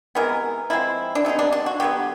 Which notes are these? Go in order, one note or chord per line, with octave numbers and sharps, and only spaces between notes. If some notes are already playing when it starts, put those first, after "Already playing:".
C3 E3 G#3 B3 A#4
F3 G#3 C4 E4
D4
C3 E3 G#3 B3 D#4
D4
D4
F#4
D3 F#3 B3 G4